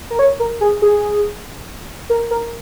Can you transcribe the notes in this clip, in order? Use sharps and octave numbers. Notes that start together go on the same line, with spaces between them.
A#4
C#5
A#4
G#4
G#4
A#4
A#4